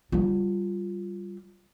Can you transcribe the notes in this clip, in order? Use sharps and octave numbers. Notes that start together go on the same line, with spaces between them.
G3 F4